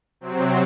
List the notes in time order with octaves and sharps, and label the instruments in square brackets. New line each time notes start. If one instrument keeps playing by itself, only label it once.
[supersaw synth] C3 F#3 C4